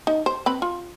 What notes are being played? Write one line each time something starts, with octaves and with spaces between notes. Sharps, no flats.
D#4
C5
C4 B4 B5
F4